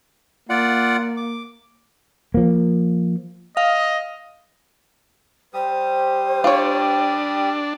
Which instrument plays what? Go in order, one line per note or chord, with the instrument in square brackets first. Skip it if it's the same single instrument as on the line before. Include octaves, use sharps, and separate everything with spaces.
[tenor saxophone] A#3 [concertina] F4 D5 F#5
[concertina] D6
[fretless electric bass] F3 A#3
[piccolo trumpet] D#5 [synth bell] F5
[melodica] G3 G4 D#6 [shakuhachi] C5
[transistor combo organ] D4 [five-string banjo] F4 C#5